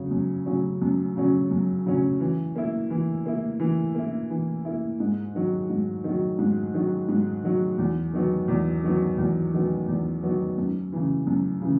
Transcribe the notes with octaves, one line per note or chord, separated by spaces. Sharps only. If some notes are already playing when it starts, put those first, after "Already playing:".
Already playing: C#3 F#3 C#4
F#2
C#3 F#3 C#4
F#2
C#3 F#3 C#4
F#2
C#3 F#3 C#4
E3
A#3 E4
E3
A#3 E4
E3
A#3 E4
E3
A#3 E4
G#2
D#3 F#3
G#2
D#3 F#3
G#2
D#3 F#3
G#2
D#3 F#3
E2
D#3 F#3 B3
E2
D#3 F#3 B3
E2
D#3 F#3 B3
E2
D#3 F#3 B3
F#2
C#3 E3
F#2
C#3 E3